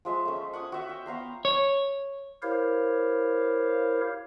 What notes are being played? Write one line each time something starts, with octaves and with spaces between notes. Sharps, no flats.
F3 G#3 E5
A3 C#4
F#5 G#5 D#6
F#4 E5
G5
B3 F5 A#5 C6
C#5
E4 G4 A#4 C5 C#5 F5